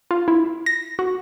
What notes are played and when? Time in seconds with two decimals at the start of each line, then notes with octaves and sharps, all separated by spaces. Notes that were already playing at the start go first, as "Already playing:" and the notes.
0.11 F4
0.28 E4
0.66 A#6
0.99 F#4